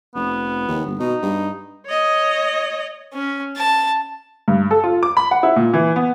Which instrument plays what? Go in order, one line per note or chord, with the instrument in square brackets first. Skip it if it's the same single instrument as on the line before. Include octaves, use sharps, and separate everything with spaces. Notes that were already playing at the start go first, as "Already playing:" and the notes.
[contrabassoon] F1 [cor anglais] B3
[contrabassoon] D#2
G1
[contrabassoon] B2 [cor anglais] D#4
[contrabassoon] G2
[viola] C#5 D#5
[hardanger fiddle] C#4
A5
[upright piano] G2
A4
F4
D6
B5
F#5
E4
A#2
E3
B3